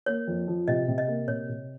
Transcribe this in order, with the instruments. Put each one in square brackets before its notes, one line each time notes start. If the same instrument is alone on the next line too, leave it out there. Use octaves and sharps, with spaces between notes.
[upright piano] A#3 [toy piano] C#5
[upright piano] F2
F3
[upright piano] C3 [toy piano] D#5
[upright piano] C3
[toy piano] D#5
[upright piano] A#3
[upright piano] C3 [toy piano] C#5
[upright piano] C3